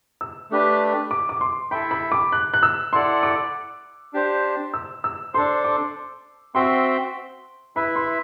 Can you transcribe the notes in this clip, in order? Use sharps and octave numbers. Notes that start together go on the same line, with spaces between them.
E6
A3 D4 G4 B4
D6
D6
C6
E4 A4 E5 G5 B5
B5
D6
F#6
F#6
E6
E4 A4 D5 F#5 C6
D6
D4 G4 C5
E6
E6
D4 A4 C5 C6
D6
C4 F#4 C5 E5 G5 C6
E4 B4 E5 B5
C6